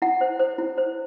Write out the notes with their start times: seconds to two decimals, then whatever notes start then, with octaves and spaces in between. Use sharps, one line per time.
0.02 E4 F#5
0.21 C5
0.39 C5
0.58 E4
0.78 C5